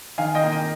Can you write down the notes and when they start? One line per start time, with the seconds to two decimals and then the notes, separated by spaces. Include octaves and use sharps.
0.18 D#3 F5 G#5
0.35 D#5 G5
0.43 A#3
0.52 D#5 G5